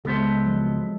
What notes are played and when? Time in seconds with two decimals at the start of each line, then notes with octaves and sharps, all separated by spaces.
0.05 C#2 G#3 B3 A4 C5
0.45 F3 F#3